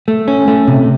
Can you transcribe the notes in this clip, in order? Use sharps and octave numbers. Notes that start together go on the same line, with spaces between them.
A3
C#4
A3
C3